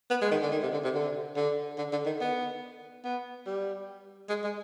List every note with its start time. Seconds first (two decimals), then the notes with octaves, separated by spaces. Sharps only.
0.10 B3
0.22 G#3
0.31 D#3
0.42 D3
0.52 D#3
0.62 C3
0.73 D3
0.84 C3
0.95 D3
1.36 D3
1.78 D3
1.92 D3
2.06 D#3
2.21 B3
3.04 B3
3.46 G3
4.29 G#3
4.44 G#3